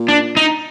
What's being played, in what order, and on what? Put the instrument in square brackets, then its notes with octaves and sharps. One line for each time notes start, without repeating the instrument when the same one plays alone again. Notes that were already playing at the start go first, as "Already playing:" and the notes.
Already playing: [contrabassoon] A#2
[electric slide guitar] D4
D#4